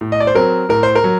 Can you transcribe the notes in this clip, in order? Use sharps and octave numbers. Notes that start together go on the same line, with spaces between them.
A2
D#5
D5
C5
F#3 C4 A#4
A2 A#4
C5
A#4
F#3